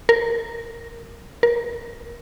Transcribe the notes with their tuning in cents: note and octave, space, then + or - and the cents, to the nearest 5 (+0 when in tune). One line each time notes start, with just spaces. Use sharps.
A#4 -5
A#4 +20